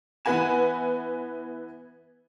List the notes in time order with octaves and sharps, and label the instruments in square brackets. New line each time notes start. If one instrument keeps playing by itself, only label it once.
[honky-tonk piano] E3 B3 B4 F#5 G#5 E7